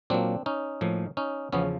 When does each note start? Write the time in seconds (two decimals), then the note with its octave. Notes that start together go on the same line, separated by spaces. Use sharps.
0.10 A#2 F#3 A#3 C4 D4
0.46 C#4 D#4
0.81 A2 F3 A#3
1.17 C#4 D#4
1.53 E2 C#3 F3 B3 C#4